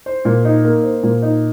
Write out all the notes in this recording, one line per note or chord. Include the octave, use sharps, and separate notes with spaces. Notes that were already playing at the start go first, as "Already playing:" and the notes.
C5
A#2
D#4
A#3
C5
A#2
D#4